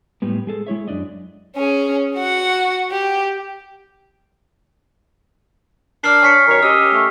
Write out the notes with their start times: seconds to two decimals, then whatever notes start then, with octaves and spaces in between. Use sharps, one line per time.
0.22 A2 G3 G#3 B3
0.47 G#3 G#4 A4
0.67 G#3 E4 C#5 E5
0.88 F#2 F3 D4 D5 D#5
1.56 C#4 G#4
2.16 F#4 F#5
2.91 G4
6.04 D4 A#4 D5 F6 C7
6.23 C#5 G#5 B6 C#7
6.48 F#2 D#3 A#4 C#5
6.63 C#4 G4 D#5 E6
6.94 A3